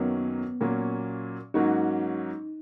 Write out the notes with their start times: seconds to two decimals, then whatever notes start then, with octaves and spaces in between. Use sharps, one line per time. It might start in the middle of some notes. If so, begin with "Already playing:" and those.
Already playing: F#2 D#3 F#3 A#3 B3 C#4
0.61 A#2 F#3 A#3 C#4
1.54 G#2 F#3 A#3 C#4 D#4 F#4